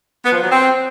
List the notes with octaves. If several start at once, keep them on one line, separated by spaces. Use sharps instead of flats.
B3
F3
F#3
C4